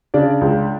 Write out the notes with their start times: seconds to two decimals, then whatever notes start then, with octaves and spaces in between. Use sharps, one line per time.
0.14 C#3 D4 D5
0.41 C#2